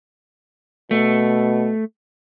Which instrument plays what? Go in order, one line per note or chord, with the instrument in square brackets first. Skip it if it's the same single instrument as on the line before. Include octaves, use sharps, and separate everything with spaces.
[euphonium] B2 [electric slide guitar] A3